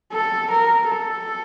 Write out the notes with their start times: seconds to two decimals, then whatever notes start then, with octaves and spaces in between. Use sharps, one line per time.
0.12 A4
0.51 A#4
0.90 A4